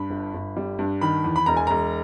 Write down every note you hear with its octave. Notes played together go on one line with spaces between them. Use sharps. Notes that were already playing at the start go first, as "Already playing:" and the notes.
Already playing: G2 B5
G1
G1
G3
G2
D#3 B5
E2
B5
E1 A#5
G#5
E1 A#5